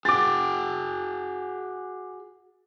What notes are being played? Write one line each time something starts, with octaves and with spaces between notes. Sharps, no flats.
F#4 G#4 D6 A6